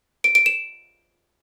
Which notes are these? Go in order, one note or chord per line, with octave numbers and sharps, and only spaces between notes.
D7
D7
E7